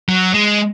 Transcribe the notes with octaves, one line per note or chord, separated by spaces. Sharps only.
F#3
G#3